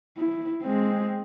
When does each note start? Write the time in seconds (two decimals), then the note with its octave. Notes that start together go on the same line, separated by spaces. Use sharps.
0.18 E4
0.64 G#3 C4